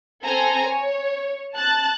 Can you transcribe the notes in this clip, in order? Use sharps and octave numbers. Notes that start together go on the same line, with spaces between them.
C4 A4 G#5 A#5
C#5
A5 F#6 A6